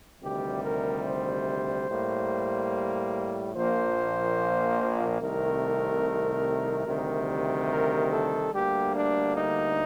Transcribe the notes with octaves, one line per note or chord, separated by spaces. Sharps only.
D2 C3 D#3 G3 G4
A#4
C5
A2 G3 A#3
A#1 A#2 F3 A#3 C5
C2 C3 D#3 A3 A#4
D2 C3 D#3 G3
A#4
A4
D2 D3 G3 A#3 G4
D4
D#4